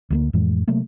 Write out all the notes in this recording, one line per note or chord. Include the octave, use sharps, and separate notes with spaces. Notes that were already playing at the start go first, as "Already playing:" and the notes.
D2 G3 A#3
F2 A2 E3 G#3
C3 F#3 A3 A#3